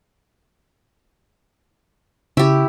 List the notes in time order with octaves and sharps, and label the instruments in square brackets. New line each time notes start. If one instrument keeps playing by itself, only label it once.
[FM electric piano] C#3 [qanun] E4 G4